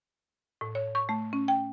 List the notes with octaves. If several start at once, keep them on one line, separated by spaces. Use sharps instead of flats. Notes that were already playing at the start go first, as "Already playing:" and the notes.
A2
C#5
C#6
A3
C#4
G5